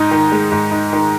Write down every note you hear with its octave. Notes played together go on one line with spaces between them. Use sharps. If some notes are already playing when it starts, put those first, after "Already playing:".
Already playing: G#2 D#4
D#3
G#3
G#2
D#4
D#3